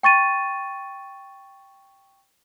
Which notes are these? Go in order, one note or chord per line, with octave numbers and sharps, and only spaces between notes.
G5 C#6 A6 D#7